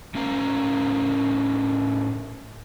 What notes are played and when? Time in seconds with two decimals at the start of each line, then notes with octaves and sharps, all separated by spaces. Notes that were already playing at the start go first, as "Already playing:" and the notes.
0.15 A2 C#4 A#4 F5 A#5